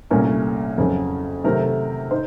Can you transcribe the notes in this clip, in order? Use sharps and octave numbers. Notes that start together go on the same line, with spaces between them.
C2 A#2 A3 C#4 A#4
F2 C#3 F#3
C3 D#3 F#3 A3 C4 A#4
D#4 C5